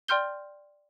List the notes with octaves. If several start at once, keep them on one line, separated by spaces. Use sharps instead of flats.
D5 G5 C6 F6 G6 G7